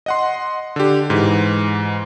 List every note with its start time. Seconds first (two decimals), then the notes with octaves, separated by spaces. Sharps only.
0.06 D#5 F#5 C6
0.76 D3 G4
1.10 G#2 E3